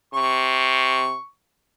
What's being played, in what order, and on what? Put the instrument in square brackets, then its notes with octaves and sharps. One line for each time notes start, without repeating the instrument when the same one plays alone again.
[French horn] C3 [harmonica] C#6